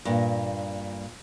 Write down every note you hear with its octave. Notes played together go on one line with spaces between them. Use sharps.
G2 A#2